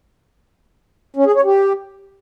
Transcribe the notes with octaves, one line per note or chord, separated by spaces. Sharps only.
C#4
G#4
C#5
G4